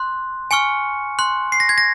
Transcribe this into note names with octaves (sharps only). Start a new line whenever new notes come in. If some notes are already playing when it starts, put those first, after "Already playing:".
Already playing: C6 F#6
G#5 C#6 F6 C#7
C6 F#6
C7
A#6
G#6
A#6